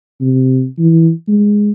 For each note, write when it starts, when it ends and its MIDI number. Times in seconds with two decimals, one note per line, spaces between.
0.21 0.67 48
0.78 1.11 52
1.28 1.71 56